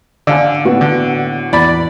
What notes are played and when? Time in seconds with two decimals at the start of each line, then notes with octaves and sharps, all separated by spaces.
0.27 D3 D5 F5 G#5
0.65 A2 B3 F#4
0.81 D3
1.53 E2 D5 B5